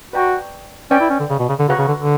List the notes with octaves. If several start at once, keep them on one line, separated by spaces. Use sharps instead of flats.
F#4 B4 D5 G5 A#5 C#6
C#4 B4 D5 G5
E4
C#4
D3
C#3
B2
C#3
D3
C#3 F#4 B4 F#5 A#5 C#6
C#3
D3
D3